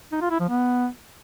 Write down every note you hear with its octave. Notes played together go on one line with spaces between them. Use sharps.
D#4
F4
E4
F3
B3